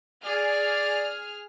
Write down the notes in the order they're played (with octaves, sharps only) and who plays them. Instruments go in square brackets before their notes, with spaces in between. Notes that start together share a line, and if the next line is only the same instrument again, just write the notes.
[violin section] G#4 F6 [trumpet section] D5